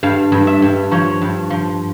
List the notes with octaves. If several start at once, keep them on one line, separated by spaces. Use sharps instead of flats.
G2 F5
G2
E5
G2
F3 C#5
G2
F3